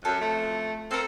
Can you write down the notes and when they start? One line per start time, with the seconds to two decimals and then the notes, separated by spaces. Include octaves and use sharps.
0.05 F#2 A4
0.20 F2 A3
0.91 C4 A4 A#4 F5